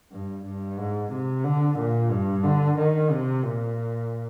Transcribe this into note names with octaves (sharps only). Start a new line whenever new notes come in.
G2
G2
G#2
C3
D3
A#2
G2
D3
D#3
C3
A#2